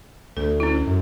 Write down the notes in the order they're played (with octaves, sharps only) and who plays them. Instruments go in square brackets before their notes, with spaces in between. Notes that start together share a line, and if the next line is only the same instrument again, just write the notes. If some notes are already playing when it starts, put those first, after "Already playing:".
[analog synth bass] D2 [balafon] A4
[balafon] C#4 E4
[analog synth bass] F#2